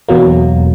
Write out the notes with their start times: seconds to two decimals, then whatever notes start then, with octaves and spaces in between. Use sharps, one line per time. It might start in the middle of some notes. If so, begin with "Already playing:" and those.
0.08 E2 B2 F#3 A#3